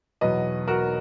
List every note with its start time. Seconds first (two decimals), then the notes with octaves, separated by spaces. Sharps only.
0.21 E2 B2 F#3 B4 D#5
0.68 F#4 A#4